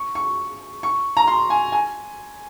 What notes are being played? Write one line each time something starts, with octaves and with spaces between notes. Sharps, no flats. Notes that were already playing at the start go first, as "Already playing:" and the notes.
Already playing: C#6
C#6
C#6
A#5
C6
G#5
G#5